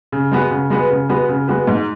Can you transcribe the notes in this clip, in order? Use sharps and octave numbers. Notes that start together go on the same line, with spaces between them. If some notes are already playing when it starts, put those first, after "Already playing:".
C#3
G#3 B3 F#4 B4
C#3
G#3 B3 F#4 B4
C#3
G#3 B3 F#4 B4
C#3
G#3 B3 F#4 B4
G#2